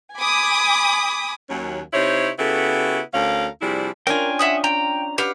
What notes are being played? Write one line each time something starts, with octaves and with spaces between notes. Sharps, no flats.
G#5 B5 D6 D#6
D#2 F#3 C#4
C3 D#4 E4 C5 C#5
C#3 B3 E4 F#4 G4 A4
D2 A3 C#4 A#4 F5
C3 F3 G3 D4 E4 G#4
C#4 D4 F4 A#4 G5 G#5
E5 F#5 D#6
G5 A#5
G4 B4 F5 F#5